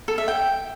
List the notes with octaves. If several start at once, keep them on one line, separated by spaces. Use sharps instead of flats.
A4
E5
G5